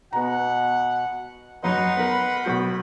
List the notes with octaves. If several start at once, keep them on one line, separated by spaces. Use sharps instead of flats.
B2 B3 F#5 A#5
F#2 F#3 D#4 B4 F#5 C6
B3 A#4 B5
B1 F#4 G6